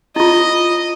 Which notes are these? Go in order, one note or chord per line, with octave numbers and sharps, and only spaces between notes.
E4 F4 D#5